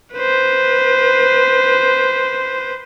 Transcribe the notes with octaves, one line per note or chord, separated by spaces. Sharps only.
B4 C5